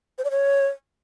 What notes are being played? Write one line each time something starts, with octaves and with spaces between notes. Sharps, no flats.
C5
D5
C#5